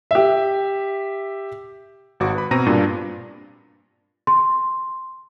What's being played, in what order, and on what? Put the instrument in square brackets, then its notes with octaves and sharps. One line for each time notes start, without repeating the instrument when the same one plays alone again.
[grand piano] G4 E5
[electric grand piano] G#1 F#4 D6
B4 B5
B2 C4 A#5 A#6 D#7
G2 A#2 D4
[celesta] C6